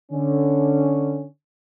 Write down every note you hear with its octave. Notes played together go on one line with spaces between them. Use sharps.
D3 C#4